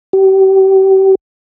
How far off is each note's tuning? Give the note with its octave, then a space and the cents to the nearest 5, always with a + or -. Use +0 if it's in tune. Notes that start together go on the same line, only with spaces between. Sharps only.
G4 -35